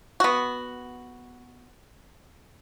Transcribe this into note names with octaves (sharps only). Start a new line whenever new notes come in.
B3 F#4